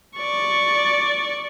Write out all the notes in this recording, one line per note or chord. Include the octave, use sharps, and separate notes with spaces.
D5 C#6